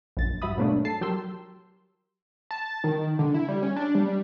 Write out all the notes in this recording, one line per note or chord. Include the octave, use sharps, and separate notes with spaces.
A#1 F#2 A6
G2 F#3 E5 B5 D#6
G#2 B2 F#3 A3 A#3 D4
A4 A5 C7
F#3 G4 A#4 C6 E6
A5
D#3
D3
E4
G3
C#4
D4
G3